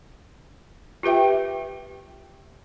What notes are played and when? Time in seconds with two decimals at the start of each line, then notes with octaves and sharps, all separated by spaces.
1.03 F4 G4 B4 E5 G5